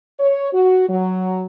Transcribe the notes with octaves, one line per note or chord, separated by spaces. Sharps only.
C#5
F#4
F#3